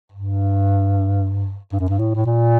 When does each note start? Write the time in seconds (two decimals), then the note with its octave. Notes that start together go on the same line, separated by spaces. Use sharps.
0.12 G2
1.73 G2
1.80 F#2
1.89 G2
1.99 A2
2.16 A2
2.26 A#2